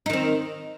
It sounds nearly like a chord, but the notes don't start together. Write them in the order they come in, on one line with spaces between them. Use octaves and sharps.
D#4 D#3 C4